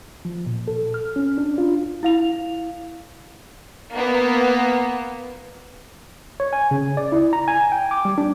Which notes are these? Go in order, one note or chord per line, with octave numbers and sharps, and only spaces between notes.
F3
A#2
A4
F6
C#4
D4
F4
E4 F5 F7
A#3 B3
C#5
G#5
C#3
D5
E4
A#5
G#5
G5
D6
G3
D4